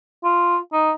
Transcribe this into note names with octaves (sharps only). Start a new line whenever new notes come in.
F4
D#4